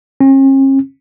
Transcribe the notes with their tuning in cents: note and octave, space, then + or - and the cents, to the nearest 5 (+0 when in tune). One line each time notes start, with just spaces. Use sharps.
C#4 -45